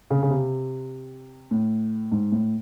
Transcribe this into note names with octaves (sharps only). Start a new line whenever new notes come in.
C#3
C#3
C3
A2
G#2
A2